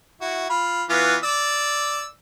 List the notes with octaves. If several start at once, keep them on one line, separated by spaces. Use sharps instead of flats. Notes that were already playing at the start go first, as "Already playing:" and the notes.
E4 F#4
F4 B5
E3 B3 F4
D5 E6